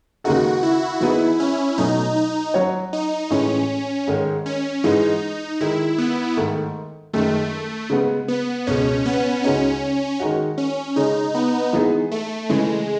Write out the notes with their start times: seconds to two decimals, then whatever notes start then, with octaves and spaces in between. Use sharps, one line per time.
0.24 D#2 C#3 G#3 D#4 F#4 A4
0.63 E4
1.01 E3 B3 D#4 E4 G#4
1.40 C#4
1.78 B2 F#3 A3 D#4
2.16 D#4
2.54 F#3 C#4 F#4 C#5
2.93 D#4
3.30 A2 E3 G#3 C#4
4.07 G#2 D#3 G#3 C#4
4.46 C#4
4.84 G#2 E3 G#3 D#4
5.61 D#3 G#3 D#4 E4
5.98 B3
6.37 G#2 D#3 A3
7.13 F#2 D#3 G#3 A3
7.90 C#3 G#3 B3
8.28 B3
8.67 C#2 B2 G#3 C#4
9.06 B3
9.44 C#2 C#3 G#3 C#4 D#4 F#4
10.20 D#3 G#3 D#4 F#4
10.58 C#4
10.96 C#3 G#3 C#4 D#4
11.35 B3
11.73 E3 G#3 B3 D#4 G#4
12.12 A3
12.49 C#3 E3 G#3 A3